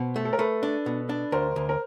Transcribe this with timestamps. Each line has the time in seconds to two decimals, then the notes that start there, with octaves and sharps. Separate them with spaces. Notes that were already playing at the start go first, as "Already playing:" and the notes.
Already playing: B2 C5
0.16 A3
0.25 A4
0.33 A#4
0.39 A3 A4 B4
0.63 D4
0.86 B2
1.09 D4
1.32 D2 A#4 C5
1.56 D2
1.69 A#4